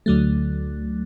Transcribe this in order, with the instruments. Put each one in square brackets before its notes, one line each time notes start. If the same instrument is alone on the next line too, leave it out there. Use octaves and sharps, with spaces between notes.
[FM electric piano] D2 D3 F#3 A3